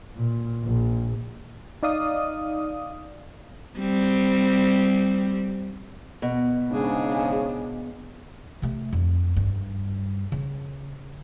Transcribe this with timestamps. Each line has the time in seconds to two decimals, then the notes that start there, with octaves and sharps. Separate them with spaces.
0.15 A#2
0.64 A#1
1.83 D#4 D5 F5 D#6
3.79 G3 C4
6.22 B2
6.71 G#2 C#3 D4 G#4
8.62 C3 A3
8.93 F2
9.37 G2
10.32 C#3